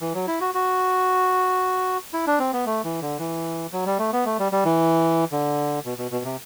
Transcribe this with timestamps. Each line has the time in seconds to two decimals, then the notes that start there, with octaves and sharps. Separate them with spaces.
0.01 E3
0.14 F#3
0.27 E4
0.41 F#4
0.54 F#4
2.13 E4
2.27 D4
2.39 C4
2.53 B3
2.66 A3
2.84 E3
3.02 D3
3.19 E3
3.73 F#3
3.86 G3
3.99 A3
4.13 B3
4.25 A3
4.39 G3
4.52 G3
4.65 E3
5.32 D3
5.85 B2
5.98 B2
6.11 B2
6.25 C3